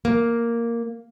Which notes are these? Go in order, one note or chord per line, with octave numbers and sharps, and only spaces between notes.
A#3